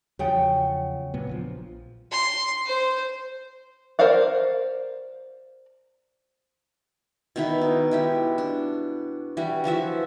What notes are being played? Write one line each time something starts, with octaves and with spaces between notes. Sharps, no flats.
E2 C#3 F3 F#3 F#5 G5
A#2 F#3 B3
A#1 E3 F3
C6
C5
A#4 C5 D5 F5 F#5
B2 D#3 E4 B5
D#4
G#3 E4 G4
D4
E3 G3 F#4
E3 F3 F#4 E5